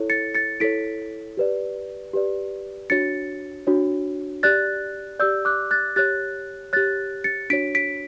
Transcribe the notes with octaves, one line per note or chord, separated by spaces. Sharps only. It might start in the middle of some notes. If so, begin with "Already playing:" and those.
Already playing: E4 A4 C#5
A6 C#7
A6 C#7
E4 A4 C#5 B6 D7
G4 B4 D5
G4 B4 D5
D4 F#4 C#5 A6 C#7
D4 F#4 C#5
G4 D5 F#6 A6
G4 D5 E6 G6
D6 F#6
F#6 A6
G4 C#5 F#6 A6
G4 C#5 F#6 A6
A6 C#7
D4 F#4 C#5 B6 D7
B6 D7